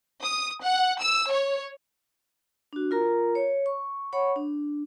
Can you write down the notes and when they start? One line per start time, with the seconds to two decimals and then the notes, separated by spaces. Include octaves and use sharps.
0.22 D#6
0.63 F#5
1.01 E6
1.31 C#5
2.73 D4 F#4
2.91 F4 A#4 A#5
3.35 C#5
3.66 C#6
4.13 C#5 F#5 B5 C#6
4.36 D4